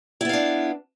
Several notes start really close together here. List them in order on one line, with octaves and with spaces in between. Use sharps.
E4 B3 F5 D4